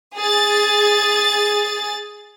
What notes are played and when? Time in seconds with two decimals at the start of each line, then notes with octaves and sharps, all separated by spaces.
0.15 G#4 A6